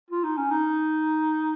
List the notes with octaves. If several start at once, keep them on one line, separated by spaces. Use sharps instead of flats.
F4
D#4
C#4
D#4